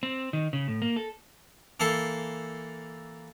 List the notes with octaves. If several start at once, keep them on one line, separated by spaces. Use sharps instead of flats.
C4
D#3
C#3
A2
A#3
A4
E3 A#3 A4 A5 C6